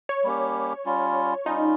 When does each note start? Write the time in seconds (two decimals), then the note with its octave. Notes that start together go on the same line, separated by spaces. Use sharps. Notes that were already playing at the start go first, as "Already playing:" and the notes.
0.09 C#5
0.24 G3 A#3 C#4 G4
0.85 G3 C#4 F4
1.45 G3 C#4 D#4 F4